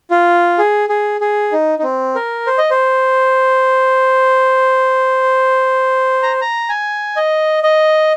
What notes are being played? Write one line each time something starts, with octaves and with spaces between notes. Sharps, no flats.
F4
G#4
G#4
G#4
D#4
D#4
C4
A#4
C5
D#5
C5
A#5
A#5
G#5
D#5
D#5